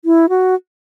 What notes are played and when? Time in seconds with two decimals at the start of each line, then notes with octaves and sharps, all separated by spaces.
0.05 E4
0.29 F#4